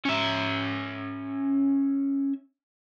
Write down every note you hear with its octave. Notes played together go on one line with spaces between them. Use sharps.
C#4 E5